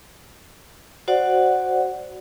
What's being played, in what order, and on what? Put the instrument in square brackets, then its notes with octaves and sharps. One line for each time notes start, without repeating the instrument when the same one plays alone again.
[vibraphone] F#4 C5 D5 F#5